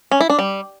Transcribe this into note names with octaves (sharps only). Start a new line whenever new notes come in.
C#4
E4
D4
G3